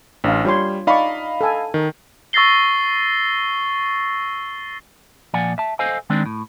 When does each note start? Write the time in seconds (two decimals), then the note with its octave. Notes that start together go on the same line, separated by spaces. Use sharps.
0.24 A1 D4 F5
0.45 G3 F4 C#5 C6
0.87 D#4 D5 D#5 F5 B5 C#6
1.41 A4 G#5
1.74 D#3
2.33 C#6 E6 A6 A#6 C7 G7
5.34 A#2 F3 D5 F#5 G#5
5.58 E5 A5
5.79 A4 C5 D#5 F5 G#5
6.10 D#3 G#3 C4 D4
6.26 A2